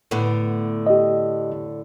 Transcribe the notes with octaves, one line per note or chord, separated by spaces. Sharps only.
A2 D3 B3
G4 D#5